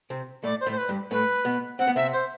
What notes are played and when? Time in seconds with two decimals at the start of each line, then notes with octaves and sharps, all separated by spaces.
0.10 C3 C4
0.44 A2 A3 D5
0.61 C5
0.66 A2 A3
0.72 C5
0.78 B4
0.89 G2 G3
1.11 A2 A3 B4
1.45 B2 B3
1.79 C4 F#5
1.88 B3
1.96 C3 C4 E5
2.13 C5